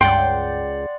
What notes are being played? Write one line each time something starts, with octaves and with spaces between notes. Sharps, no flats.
C#2 G2 D5 F#5 G5 C6